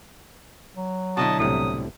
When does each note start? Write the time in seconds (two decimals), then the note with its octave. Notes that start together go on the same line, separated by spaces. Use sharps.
0.76 F#3
1.17 B2 D3 E4 F#4 D#5 A5
1.39 C2 A2 C3 D#6